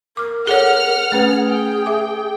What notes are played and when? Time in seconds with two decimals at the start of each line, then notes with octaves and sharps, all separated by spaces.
0.17 A#4 D6 F6
0.47 G#4 A4 C#5 F#5 F6
1.12 A3 C#4 G#4 B4
1.46 G5
1.86 E5 D6